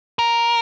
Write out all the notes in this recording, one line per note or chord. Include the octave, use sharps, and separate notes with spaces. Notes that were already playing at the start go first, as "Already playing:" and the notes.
A#4